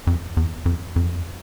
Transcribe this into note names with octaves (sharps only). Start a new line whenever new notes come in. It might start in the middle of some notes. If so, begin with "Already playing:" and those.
F2
E2
F2
F2